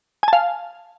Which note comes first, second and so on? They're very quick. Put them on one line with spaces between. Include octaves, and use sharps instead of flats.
G#5 A5 F5